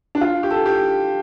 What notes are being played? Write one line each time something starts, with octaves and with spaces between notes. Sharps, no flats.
D4
F4
G4
A4
G4